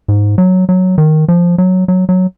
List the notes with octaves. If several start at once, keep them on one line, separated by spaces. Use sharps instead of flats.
G#2
F#3
F#3
D#3
F3
F#3
F#3
F#3